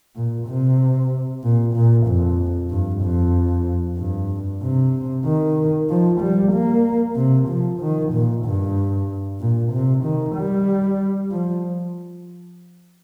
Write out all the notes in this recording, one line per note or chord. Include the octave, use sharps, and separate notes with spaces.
A#2
C3
A#2
A#2
F2
G2
F2
G2
C3
D#3
F3
G3
A#3
C3
F3
D#3
A#2
G2
A#2
C3
D#3
G3
F3